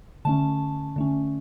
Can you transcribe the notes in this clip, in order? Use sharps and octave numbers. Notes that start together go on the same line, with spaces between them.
D3 A3 C#4 A5
D3 A3 C#4